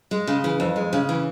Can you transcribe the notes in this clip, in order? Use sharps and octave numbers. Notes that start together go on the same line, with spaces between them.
G#3
C#3
E3
F2
G#3
C#3
E3